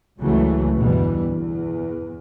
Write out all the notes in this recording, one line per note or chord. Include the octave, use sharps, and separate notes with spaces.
C#2 C#3 E3 F#3 A3
G1 E2 B2 E3 G3
E2